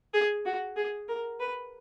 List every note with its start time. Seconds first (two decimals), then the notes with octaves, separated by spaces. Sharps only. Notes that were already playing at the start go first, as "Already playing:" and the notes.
0.14 G#4
0.45 F#4
0.76 G#4
1.08 A#4
1.40 B4